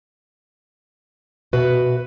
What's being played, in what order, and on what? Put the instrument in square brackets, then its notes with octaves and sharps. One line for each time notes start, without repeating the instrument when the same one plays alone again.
[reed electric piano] B2 [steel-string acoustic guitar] F#4 B4 E5